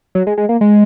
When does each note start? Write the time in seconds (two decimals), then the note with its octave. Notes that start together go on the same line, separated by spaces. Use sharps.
0.15 F#3
0.27 G#3
0.38 G#3
0.49 A#3
0.61 G#3